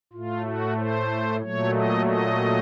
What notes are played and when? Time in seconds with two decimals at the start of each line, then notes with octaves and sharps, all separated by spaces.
0.13 A2 A3 F4
0.45 F#4
0.78 C5
1.41 A#2 F#3 A3 C#5
1.74 D#5
2.06 D#5